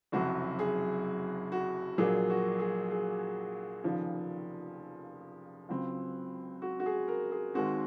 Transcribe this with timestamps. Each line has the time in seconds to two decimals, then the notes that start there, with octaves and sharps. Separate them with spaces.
0.12 F#1 F2 C3 F#3 F#4
0.59 G#4
1.52 F#4
1.98 A#1 A#2 F#3 A#3 G#4
2.30 F#4
2.60 G#4
2.91 G#4
3.84 F1 D#2 C#3 F3
5.69 C#2 C#3 F#3 C4
6.62 F#4
6.80 F#4
6.86 G#4
7.08 A#4
7.32 G#4
7.54 D#2 D#3 G#3 C4 F#4